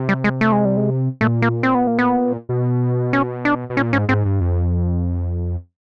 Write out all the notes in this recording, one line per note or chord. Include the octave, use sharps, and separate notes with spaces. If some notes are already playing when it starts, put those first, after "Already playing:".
Already playing: C3
G3
G#3
A3
G#3
G3
G#3
A#2 A3
A#3
C4
B3
A#3
B3
B2
C#4
D4
B2
A#2 C#4
G#2 C#4
G#2 C4
G2
F2